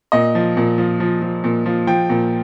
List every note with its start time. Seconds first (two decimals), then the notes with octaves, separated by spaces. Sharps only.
0.12 A#2 D#5
0.35 F3
0.57 A#2
0.78 F3
1.00 F3
1.22 F3
1.44 A#2
1.66 F3
1.87 F3 G5
2.10 A#2